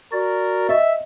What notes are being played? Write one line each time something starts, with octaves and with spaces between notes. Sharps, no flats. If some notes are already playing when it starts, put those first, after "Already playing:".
F#4 A#4 D5
D#5 E5